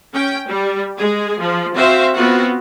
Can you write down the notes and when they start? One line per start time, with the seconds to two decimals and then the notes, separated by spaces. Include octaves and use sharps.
0.14 C#4 G5
0.47 G3
0.97 G#3 G#4
1.39 F3
1.75 C4 F#4 C5 E5 F5
2.14 B3 C4 F4 F#4 F#5